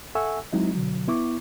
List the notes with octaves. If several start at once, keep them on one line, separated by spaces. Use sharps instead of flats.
A4 E5 F#5 G#5 C#6 E6
F#3 G#3 C4 D#4 E4
B2 D3 F#3
B3 E4 C#6 D6